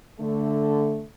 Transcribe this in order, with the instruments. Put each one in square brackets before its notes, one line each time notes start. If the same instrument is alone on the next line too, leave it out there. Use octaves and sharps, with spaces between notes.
[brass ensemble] D3 A3